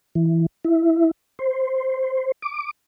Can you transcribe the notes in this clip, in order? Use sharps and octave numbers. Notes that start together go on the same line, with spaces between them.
E3
E4
C5
D6